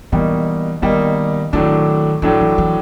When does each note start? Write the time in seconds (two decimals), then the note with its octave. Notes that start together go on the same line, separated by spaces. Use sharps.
0.12 B2 E3 G3 A#3 D#4
0.82 B2 D#3 G3 A#3 D#4
1.53 A2 D#3 F#3 A3 D4
2.22 A2 F3 F#3 A3 D4
2.41 E3
2.58 E3